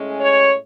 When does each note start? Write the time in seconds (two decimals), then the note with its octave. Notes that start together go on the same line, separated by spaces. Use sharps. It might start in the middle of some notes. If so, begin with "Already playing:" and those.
Already playing: A2 G#3 C#4
0.18 C#5